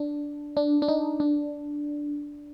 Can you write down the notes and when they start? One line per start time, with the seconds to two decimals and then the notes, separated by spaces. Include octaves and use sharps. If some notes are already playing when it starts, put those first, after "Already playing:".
Already playing: D4
0.57 D4
0.82 D4
0.88 D#4
1.20 D4